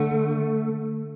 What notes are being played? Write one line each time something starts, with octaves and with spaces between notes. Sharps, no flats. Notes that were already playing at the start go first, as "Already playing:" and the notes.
Already playing: D3 A3